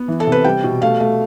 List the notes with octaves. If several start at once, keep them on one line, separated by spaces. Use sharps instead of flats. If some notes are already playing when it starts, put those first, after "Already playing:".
Already playing: B3
E3
A4
C3
B4
G3 G5
B2
A3 F5
A3